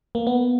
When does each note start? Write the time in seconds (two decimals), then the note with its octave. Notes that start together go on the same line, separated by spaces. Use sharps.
0.15 A#3
0.27 B3